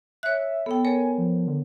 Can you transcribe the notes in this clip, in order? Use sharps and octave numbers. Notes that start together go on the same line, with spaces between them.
C#5 E5 F#6
B3 A4 G5
A4 A#4 C#5 G#5
F3
D3